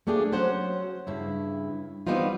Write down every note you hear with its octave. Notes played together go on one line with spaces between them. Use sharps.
A3 A#3 D4 G4 G#4
F#3 C#4 C5 F#5
G2 C#3 E4
E3 G3 B3 C4 D#4 F4